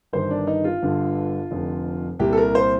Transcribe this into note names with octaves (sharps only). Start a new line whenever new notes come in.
G1 G2 D#3 C5
D4
D#4
F4
G1 G2 D3
F1 F2 D3
C2 A#2 G4
A4
A#4
C5